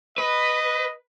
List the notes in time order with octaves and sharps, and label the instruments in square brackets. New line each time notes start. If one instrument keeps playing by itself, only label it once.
[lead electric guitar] B4 [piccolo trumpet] D#5